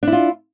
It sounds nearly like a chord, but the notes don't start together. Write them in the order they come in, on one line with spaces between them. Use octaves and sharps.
D4 E4 F4